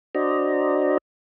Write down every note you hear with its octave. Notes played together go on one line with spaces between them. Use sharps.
D4 F#4 C5 D5 D#5 A#5